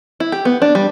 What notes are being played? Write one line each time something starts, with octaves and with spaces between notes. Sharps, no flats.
E4
G4
B3
D4
G3